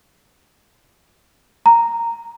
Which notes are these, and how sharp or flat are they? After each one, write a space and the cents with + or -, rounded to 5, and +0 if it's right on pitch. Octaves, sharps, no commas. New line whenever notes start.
A#5 -5